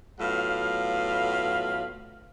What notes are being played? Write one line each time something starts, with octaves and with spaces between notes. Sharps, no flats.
A2 F#3 B3 F4 F5